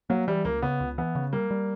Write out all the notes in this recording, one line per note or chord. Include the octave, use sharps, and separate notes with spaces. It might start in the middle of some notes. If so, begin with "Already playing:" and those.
F#3 A#3
E3 G3
C#2 A#3
C#3 B3
C#2
E3 B3
C#3
G3 A#3
G3